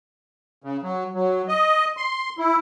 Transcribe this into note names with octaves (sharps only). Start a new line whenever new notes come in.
C#3
F#3
F#3
D#5
C6
E4